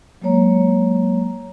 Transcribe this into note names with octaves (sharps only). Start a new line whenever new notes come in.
F#3 G#3 A#3 C#5 A#5